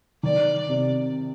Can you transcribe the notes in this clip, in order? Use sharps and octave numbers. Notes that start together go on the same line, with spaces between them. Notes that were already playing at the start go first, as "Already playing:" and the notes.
D#3 D5
C3